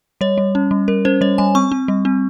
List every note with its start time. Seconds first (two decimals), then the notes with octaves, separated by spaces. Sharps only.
0.21 G3 C#5
0.38 G3
0.55 C#4
0.71 G3
0.88 G3 A#4
1.05 C#4 C5
1.21 G3 C#5
1.38 G3 G#5
1.55 C4 C#6
1.72 C4
1.88 G3
2.05 C4